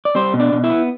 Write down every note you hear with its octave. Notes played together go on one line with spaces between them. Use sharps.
D5
G3 C4 C5
B2
D4 D5
B2
E4 E5
B3